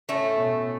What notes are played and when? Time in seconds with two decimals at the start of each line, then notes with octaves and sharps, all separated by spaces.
0.09 A2 A3 C#4
0.37 B2